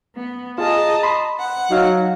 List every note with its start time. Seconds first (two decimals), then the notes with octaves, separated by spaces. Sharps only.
0.15 B3
0.58 F4 G#4 D#5 A5 A#5
1.03 B5 C6
1.38 F#5
1.71 F#3 D#4 F5